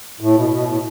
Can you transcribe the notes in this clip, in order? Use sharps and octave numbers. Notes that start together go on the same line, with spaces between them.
A2
B2
B2
A2